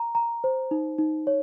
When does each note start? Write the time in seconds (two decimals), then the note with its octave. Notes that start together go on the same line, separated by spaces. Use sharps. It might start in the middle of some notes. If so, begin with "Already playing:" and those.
Already playing: A#5
0.15 A#5
0.44 C5
0.71 D#4
0.98 D#4
1.27 C#5